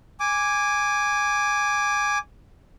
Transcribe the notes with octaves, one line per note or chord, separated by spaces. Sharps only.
G#5 D6